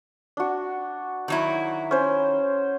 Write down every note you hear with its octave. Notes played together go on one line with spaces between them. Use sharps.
D4 F#4
D#3 F#3 E4
C#4 C5